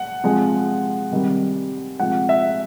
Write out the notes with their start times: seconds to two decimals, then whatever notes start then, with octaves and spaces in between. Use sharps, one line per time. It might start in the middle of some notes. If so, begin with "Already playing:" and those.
Already playing: F#5
0.24 C3 F3 G#3
1.12 C3 D#3 G3
2.00 C3 F3 G#3 F#5
2.29 E5